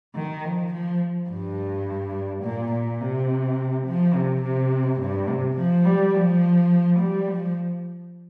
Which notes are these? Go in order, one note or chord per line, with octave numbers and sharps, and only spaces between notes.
D#3
F3
F3
G2
A#2
A#2
C3
F3
C3
C3
G2
C3
F3
G3
F3
G3
F3